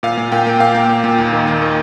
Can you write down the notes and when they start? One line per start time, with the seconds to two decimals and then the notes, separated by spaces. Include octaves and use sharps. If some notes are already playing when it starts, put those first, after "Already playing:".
0.03 A#2 F5
0.17 A#2
0.32 A#2 G5
0.47 A#3
0.60 A#2 F5
0.75 A#3
0.89 A#2
1.04 A#2
1.18 D#2
1.33 D#3
1.47 A#3
1.62 D#3